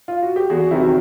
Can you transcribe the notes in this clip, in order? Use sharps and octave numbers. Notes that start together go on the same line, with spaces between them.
F4
F#4
G4
E2 F#4 G#4
C3 D#3 F#3 E4 F#4